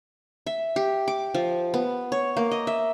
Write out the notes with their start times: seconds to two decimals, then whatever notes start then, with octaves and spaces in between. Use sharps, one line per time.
0.47 E5
0.76 G4
1.08 D6
1.34 F3
1.74 B3
2.12 C#5
2.37 A#3
2.51 D#5
2.67 E5